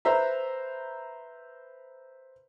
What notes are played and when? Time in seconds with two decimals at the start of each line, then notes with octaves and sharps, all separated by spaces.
0.05 B4 C5 E5 A#5